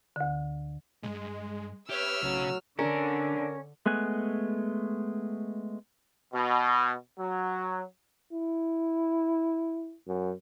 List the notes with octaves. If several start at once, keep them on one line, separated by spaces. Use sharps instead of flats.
D2 D3
B1 G2 G#3
G4 B4 C#5 E5 E6 F6
B1 A2 C#3 F#3
D3 C#4 D4 A#4
G#3 A3 B3 G#5 F#6
B2
F#3
E4
F#2